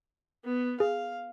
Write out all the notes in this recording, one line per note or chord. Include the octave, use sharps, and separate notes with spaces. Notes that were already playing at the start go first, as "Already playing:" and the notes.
B3
G#4 F5